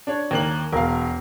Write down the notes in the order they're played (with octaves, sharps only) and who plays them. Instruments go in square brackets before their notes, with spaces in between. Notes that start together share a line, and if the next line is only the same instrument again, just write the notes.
[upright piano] D4 C#5
D#2 A#3 F#7
[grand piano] E1 [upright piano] A#4 F5